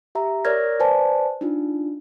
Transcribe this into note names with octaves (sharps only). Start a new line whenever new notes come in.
G4 E5 A#5
A#4 C#5 D5 F6 G#6 A#6
B4 C5 D5 G#5 A5
D4 D#4 F4